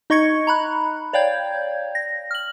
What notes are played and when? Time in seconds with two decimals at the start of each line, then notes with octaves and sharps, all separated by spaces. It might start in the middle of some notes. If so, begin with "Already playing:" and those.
0.10 D#4 D#5 C#6 G#6 C#7
0.47 A#5 B5 F#6
1.13 C#5 D5 F5 G5 G6 G#6
1.95 A#6
2.31 F6 F#7